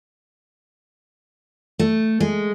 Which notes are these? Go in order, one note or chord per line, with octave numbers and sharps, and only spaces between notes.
A3
G#3